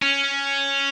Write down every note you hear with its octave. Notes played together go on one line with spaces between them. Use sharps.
C#4